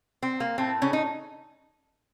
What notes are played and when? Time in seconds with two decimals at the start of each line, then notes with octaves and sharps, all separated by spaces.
0.22 C4
0.40 A#3
0.58 A2 A3 C4
0.82 C#3 C#4
0.93 D#4